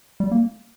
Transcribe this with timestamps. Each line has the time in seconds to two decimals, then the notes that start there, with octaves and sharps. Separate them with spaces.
0.20 G3
0.31 A#3